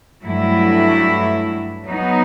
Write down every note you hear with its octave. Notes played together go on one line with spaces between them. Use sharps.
G2 F#3 A3 E4
F#3 B3 D#4